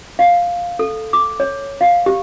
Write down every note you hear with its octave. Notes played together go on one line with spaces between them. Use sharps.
F5
A4
D6
C#5
F5
G4